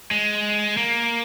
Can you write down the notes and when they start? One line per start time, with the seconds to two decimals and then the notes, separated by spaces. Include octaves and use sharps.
0.11 G#3
0.77 A#3